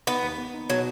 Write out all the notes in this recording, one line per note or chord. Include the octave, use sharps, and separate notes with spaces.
B3 D#4
D#2
B3
D#4
B2 F#3